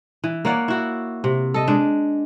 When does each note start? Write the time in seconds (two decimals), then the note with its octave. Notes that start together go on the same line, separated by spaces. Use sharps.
0.24 E3
0.45 A#3 C#5 D5 F#5
0.68 E4 F#4
1.24 C3
1.54 A4 D#5
1.68 G#3 D4